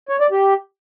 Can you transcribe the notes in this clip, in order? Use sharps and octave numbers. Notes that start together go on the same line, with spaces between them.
C#5
D5
G4